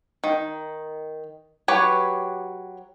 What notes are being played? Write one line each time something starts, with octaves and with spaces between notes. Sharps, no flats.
D#3
F#3 G4 B4 C#5